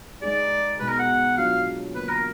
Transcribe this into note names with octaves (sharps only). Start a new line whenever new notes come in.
G#3 D#4 G#4 D5
B2 G#3 D#4 G#4 B4
A#4
F#5
F#3 D4 F4 F5
D3 F#3 A#3 B4
A#4